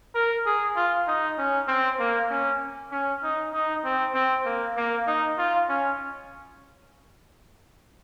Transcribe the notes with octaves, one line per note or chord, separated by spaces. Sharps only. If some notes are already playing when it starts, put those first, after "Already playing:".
A#4
G#4
F4
D#4
C#4
C4
A#3
C#4
C#4
D#4
D#4
C4
C4
A#3
A#3
D#4
F4
C#4